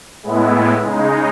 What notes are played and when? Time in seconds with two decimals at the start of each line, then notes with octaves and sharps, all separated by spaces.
0.23 A2 G#3 B3 E4
0.84 C#3 G#3 D#4